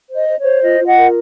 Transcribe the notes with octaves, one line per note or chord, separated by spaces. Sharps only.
C5
D#5
C5
C#5
C5
F4 D#5
F4
D#5 F#5
A#4